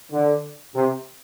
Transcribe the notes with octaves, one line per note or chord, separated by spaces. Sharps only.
D3
C3